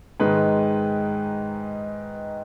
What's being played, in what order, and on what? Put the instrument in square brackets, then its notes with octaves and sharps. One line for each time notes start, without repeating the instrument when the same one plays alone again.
[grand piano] G#2 D#3 G#3 B4